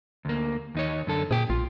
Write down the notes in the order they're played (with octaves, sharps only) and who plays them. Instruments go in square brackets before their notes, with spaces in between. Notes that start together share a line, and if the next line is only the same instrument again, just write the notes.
[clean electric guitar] D2 A#3
D#2 D#4 C#5
F#2 D3 A4
[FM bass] A#2 [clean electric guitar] G#4 G5
[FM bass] A#1 [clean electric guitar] F4